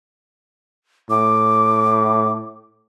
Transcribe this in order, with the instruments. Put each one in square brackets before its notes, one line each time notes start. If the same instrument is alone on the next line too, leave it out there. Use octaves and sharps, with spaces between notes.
[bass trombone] A2 [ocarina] D6